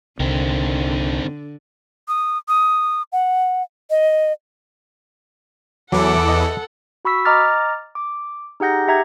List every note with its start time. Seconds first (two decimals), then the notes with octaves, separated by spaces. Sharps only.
0.20 C2 D3 D#3 C4
2.08 D#6
2.48 D#6
3.13 F#5
3.90 D#5
5.92 E2 E3 F#3 A4 F#5 D6
6.28 D#5
7.05 F#4 B5 C#6 E6 B6
7.25 D#5 A#5 D6 F6 A6
7.95 D6
8.60 D#4 G4 G#4 F#5 G6 A#6
8.88 G4 E5 A#5 G#6